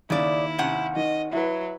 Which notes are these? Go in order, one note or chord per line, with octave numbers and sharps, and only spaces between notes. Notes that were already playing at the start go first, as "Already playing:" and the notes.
D#2 C#3 E4 D5
C3 C#4 F#5
D#3 D#5
F#3 E4 B4